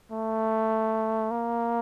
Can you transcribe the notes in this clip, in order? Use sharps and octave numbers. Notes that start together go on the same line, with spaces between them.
A3
A#3